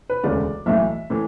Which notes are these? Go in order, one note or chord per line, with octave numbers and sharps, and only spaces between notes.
B4
E1 D2 C#3 G#3 D5
B1 A2 E3 A3 E5
A2 E3